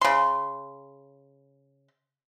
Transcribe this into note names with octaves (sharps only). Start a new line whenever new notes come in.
C#3 C6